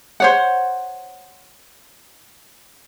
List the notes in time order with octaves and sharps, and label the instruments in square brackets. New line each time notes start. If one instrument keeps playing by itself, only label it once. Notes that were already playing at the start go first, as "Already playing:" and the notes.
[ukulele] C5 C#5 F#5